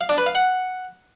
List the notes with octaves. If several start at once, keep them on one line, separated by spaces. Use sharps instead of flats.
F5
D4
B4
F5
F#5